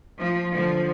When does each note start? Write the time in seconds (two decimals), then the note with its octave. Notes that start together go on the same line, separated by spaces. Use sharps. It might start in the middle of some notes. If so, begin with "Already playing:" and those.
0.17 F3
0.53 D3 F3